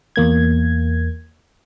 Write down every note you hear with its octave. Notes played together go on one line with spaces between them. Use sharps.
E2 A#3 G#6